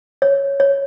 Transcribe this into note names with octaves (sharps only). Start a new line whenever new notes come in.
C#5
C#5